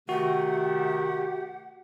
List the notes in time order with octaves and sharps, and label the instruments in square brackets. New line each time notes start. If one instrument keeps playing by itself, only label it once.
[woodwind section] C3 D#3 A3 [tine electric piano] F#4 [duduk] G4 [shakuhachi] F#5